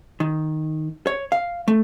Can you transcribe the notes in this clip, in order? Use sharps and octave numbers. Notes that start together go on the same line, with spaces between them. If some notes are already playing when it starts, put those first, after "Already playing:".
D#3
C#5
F5
A3